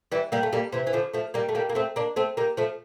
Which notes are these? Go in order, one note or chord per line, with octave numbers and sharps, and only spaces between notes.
E3 G3
G3 A#3
A3
G3 A#3
C3 E3
E3
D3 F3
F3 A3
G3 A#3
A3
G3 A#3
A#3
A3 C4
A#3 D4
A3 C4
G3 A#3
F3 A3